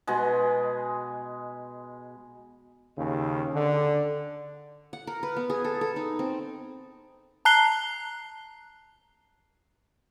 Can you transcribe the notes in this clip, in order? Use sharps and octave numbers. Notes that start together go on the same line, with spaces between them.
B2 G#3
D#2 C#3
D3
F#5
A#4
B4
B3
G#4
A4
A4
D#4
C4
A5 A#5 F#6 C7 G7